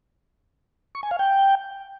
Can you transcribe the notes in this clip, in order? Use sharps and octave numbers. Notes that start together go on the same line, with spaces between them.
C#6
G#5
F5
G5